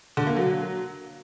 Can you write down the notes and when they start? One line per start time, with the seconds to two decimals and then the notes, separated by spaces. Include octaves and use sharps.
0.17 D3
0.27 A#3
0.36 F#3